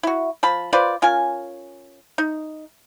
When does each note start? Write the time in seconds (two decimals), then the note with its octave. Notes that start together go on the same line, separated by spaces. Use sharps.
0.03 E4 F#4
0.43 F3 A5 B5
0.73 F4 B4 C5 D5
1.02 C#4 F4 A#4 G#5
2.18 D#4